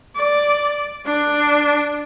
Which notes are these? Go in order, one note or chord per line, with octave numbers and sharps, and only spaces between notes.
D5
D4